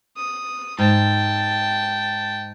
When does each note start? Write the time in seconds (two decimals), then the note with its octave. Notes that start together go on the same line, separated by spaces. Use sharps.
0.17 D#6
0.78 G#2 G5 A5